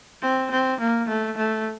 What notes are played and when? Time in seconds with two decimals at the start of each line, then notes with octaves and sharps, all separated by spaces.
0.22 C4
0.51 C4
0.80 A#3
1.08 A3
1.37 A3